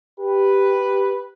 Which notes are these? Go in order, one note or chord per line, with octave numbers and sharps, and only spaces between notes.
G4 B4